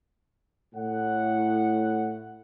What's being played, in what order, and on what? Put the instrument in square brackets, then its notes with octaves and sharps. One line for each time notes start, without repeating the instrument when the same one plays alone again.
[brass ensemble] A2 F#5